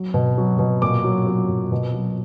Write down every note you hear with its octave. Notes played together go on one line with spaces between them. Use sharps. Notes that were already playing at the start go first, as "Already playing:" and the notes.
Already playing: F#3
B2
F#3
B2
A#2 D6
F#3
F#3
A#2
B2
F#3